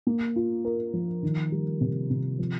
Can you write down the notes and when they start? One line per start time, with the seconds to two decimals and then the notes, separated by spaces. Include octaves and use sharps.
0.07 A#3
0.36 F4
0.65 A#4
0.93 F3
1.23 D#3
1.52 G3
1.81 C3
2.10 C3
2.39 F3